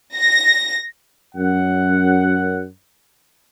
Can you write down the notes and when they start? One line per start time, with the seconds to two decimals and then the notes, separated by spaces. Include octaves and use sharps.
0.15 A#6
1.35 F#2 F#5